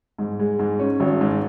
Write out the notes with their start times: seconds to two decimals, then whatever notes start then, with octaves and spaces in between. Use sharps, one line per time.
0.19 G#2
0.39 G#3
0.59 G#2
0.79 C#4
1.00 G#1
1.21 G#2